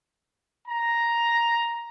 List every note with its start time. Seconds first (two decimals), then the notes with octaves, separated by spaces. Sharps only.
0.67 A#5